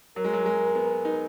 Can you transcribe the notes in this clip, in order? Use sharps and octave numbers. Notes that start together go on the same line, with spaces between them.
F#3 A#4
G#3
F#3
G#3
B3
D#4